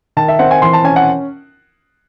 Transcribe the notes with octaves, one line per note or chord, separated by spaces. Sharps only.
D#3 A5
E5
C4 F#5
G#5
E3 C6
A5
C#4 G#5
F#5